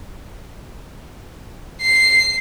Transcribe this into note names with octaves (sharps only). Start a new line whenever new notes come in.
C7